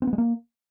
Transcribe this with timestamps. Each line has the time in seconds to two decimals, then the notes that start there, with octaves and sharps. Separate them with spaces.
0.02 C4
0.07 B3
0.13 G#3
0.18 A#3